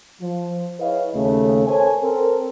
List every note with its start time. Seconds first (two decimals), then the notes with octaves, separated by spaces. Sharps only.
0.21 F3
0.80 E4 G#4 B4 C#5 D#5 F5
1.15 D#2 C#3 A3
1.67 A4 A#4 C5 C#5 G#5
2.02 C4 A4 A#4